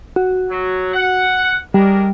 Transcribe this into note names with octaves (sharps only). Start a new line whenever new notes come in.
F#4
F#3
F#5
G3 G#3 D4 A#4